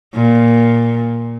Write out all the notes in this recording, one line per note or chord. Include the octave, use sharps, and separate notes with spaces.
A#2